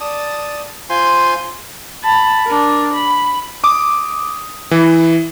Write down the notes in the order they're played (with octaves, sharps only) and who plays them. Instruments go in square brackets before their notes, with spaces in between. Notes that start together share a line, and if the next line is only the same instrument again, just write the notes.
[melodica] D5 A5 D#6
F4 C5 G#5 C6
[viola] A5 B5
D4 A#4
B5
[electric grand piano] D6 D#6
E3